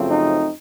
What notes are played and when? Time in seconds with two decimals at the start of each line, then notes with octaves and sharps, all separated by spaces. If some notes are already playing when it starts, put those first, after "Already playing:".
Already playing: F#2 C#3 F3 A3 C4
0.10 D#4